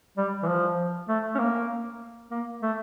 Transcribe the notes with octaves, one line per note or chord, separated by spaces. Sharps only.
G3
E3
F3
A3
C#4
A#3
A#3
A3